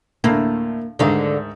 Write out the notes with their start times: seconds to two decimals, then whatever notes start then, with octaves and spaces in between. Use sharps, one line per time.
0.24 D2 A2 A#3
0.99 D2 G#2 D3 D#3 F5